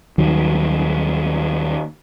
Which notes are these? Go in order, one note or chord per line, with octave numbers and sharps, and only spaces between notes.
D#2 D#3 F#3 G3